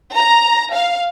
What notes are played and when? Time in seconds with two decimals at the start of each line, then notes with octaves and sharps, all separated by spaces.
0.15 A#5
0.73 F5